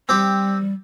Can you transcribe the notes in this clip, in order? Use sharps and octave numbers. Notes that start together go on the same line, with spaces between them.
G3 C4 G4